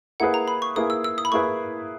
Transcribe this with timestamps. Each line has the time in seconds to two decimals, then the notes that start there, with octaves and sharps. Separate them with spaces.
0.20 A#3 E4 G#4 B4 F#5
0.34 A#5
0.48 B5
0.62 C#6
0.76 A#3 E4 G#4 B4 D#6
0.90 E6
1.04 E6
1.18 D#6
1.25 B5
1.32 A#3 E4 G#4 B4 C#6